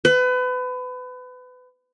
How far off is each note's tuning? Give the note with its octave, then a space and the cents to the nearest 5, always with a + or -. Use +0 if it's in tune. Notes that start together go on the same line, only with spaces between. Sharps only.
B4 +30